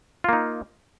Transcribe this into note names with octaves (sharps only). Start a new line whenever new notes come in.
A#3 D#4 F4